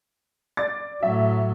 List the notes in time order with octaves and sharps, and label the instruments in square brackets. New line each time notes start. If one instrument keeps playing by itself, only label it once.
[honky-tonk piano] D5 D6 A6
[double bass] A2 F#3 [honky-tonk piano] E5